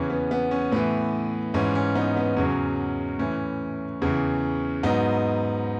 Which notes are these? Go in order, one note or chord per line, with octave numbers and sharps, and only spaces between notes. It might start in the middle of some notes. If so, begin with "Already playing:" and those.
Already playing: E2 C#3 E3 C#4
B3
B3
C#4
A2 E3 B3
G#2 E3 C#4
C#4
B3 D#4
B3
E2 C#3 F#3 C#4
A2 E3 C#4
E2 C#3 E3
G#2 F#3 B3 D#4